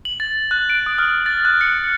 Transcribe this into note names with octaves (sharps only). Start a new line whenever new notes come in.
F#7
A6
F#6
D7
D#6
F6
A6
F#6
C#7